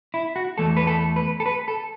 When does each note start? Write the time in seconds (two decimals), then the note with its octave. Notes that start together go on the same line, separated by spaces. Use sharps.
0.14 E4
0.36 F#4
0.58 E2 E3 A3 A4
0.77 B4
0.87 A4
1.16 B4
1.40 A4
1.46 B4
1.68 A4